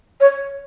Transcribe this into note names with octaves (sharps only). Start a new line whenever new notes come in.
C#5